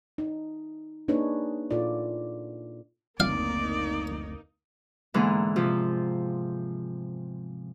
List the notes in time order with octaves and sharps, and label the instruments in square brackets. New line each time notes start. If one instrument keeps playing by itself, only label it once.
[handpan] D#4
A#3 D4 D#4 G#4 B4 C#5
A#2 E4 F4 A4 D5
[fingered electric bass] F#1 D2 C4 [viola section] A#3 D#4 [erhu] D5 [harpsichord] F5
[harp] G#2 D3 E3 A#3 B3
C3 F3 F4